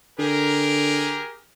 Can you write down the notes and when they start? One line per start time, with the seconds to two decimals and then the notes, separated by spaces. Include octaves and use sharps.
0.19 D3 G4 G#4 A#4